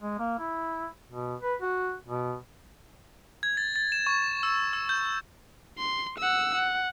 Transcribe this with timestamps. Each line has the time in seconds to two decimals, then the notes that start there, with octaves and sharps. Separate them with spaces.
0.02 G#3
0.19 A#3
0.39 E4
1.11 B2
1.41 B4
1.61 F#4
2.08 B2
3.43 G#6
3.57 A6
3.76 A6
3.92 E7
4.07 C#6
4.43 E6
4.73 E6
4.89 G6
5.78 C6
6.19 F#5 E6
6.55 F#5